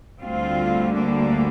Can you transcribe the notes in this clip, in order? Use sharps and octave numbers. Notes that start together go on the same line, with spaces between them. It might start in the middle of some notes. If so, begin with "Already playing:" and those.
D2 D3 G3 C4 F4
A#3 D4